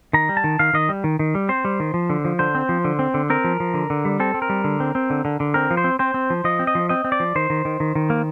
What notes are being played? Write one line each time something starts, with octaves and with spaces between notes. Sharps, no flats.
D#3 A#5
G3
A5
D#3
D#3 F5
D#3 D#5
G3
D#3
D#3
G3
C4 C5
G3
D#3
F3
D3
F3
D3 C5
C4
F3
D3
C4
D3
C4 A#4
F3
F3
D3
D3
G3
C4 A4
C4
A#4
G3
D3
C4
C4
D3
D3
D3
C4 A#4
F3
C5
C4
C4 C5
C4
F3
F3 D#5
C4
D#5
F3
C4 D#5
C4
D5
F3
D#3 C5
D#3
D#3
D#3
D#3
A#3